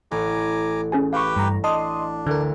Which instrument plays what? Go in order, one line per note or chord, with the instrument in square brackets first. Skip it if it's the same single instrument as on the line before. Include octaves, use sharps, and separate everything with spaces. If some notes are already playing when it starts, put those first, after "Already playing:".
[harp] A1 [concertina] G#5 A#5 D6
[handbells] C#4 G#4 G#5
[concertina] G4 B4 G5 [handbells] F5 C#6
[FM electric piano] G2 A#5
[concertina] D4 [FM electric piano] D#5 C6 D#6 [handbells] A5
[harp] D2 [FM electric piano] D3 A#4